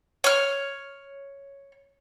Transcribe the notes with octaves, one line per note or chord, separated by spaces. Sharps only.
C#5 F6